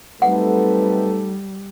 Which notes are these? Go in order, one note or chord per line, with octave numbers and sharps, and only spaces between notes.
F#3 G3 A3 C4 D#4 A4 B4 F#5